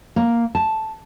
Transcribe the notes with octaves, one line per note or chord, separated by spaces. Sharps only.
A#3
A5